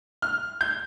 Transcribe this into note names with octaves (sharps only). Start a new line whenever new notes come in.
F6
G6